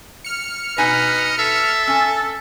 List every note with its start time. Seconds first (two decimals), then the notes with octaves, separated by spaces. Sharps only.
0.24 F6 C#7
0.78 B2 D#4 B4 D#5 G#5
1.39 A4 E5
1.87 C#4 G#5